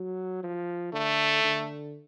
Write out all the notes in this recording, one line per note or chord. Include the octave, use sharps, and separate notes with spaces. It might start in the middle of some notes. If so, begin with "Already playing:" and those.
Already playing: F#3
F3
D3 A3
D3